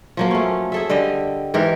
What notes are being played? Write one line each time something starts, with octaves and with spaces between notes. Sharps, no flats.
F3 F#3 A#3
A3 C#4
G#4 A4 E5
D3 G3 G4 D#5
G#2 E3 G4 A#4